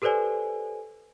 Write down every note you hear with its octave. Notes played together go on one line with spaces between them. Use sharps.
G4 A4 B4 C5 D5 G#5